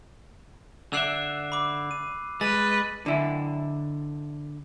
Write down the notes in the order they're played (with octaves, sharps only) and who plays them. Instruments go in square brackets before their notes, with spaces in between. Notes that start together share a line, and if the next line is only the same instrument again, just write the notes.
[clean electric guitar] D3 D5 E5 [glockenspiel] E6 F#6 C7
[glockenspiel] B5 D6
D#7
[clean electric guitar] G#3 [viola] B4 D#5 [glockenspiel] A6
[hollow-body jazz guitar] D3 E4